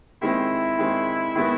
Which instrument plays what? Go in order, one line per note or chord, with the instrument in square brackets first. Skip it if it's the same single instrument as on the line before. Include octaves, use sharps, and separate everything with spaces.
[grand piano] D#3 G#3 C4 [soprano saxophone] E4
[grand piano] D#3 G#3 C4
D#3 G#3 B3